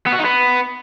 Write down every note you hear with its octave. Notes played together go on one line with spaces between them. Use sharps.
B3
F#4
D#4
B3